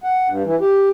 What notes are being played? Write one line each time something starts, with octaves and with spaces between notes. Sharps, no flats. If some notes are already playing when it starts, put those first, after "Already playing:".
F#5
G2
E3
G4